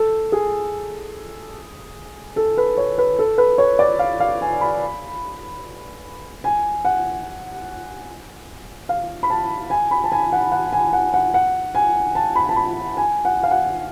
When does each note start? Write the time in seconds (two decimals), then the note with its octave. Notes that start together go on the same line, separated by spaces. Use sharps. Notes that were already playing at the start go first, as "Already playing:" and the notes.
Already playing: A4
0.32 G#4
2.36 A4
2.57 B4
2.78 C#5
2.98 B4
3.19 A4
3.38 B4
3.58 C#5
3.79 D5
3.99 F5
4.20 F5
4.41 G#5
4.61 B5
6.44 G#5
6.85 F#5
8.89 F5
9.23 B5
9.30 A5
9.70 G#5
9.91 B5
10.04 A5
10.12 G#5
10.32 F#5
10.52 F#5
10.73 G#5
10.93 F#5
11.14 F#5
11.34 F#5
11.75 G#5
12.15 A5
12.36 B5
12.49 A5
12.56 B5
12.97 G#5
13.25 F#5
13.43 F5
13.51 F#5